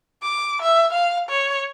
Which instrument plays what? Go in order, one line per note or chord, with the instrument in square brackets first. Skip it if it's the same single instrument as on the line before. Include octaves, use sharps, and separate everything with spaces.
[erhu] D6
E5
F5
C#5